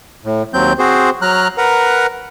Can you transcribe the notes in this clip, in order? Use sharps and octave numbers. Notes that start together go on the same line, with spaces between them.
A2
D#2 F#3 C4 G6
C4 F#4 G#4 C5
F#3 A#5 F6 F#6
A#4 B4 F#5 A#5